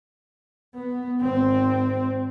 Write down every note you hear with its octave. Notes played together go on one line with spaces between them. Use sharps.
B3
G#1 C4